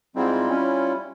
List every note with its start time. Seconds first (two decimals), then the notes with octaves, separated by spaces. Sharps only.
0.16 G#2 G3 C4 E4 F4
0.50 C#4